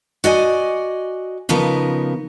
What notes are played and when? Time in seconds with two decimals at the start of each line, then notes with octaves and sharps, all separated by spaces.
0.24 F#4 D5 D#5 G#5
1.49 C#3 F3 B3 D#4 A#4